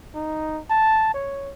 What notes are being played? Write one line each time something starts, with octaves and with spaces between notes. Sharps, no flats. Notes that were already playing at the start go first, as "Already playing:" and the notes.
D#4
A5
C#5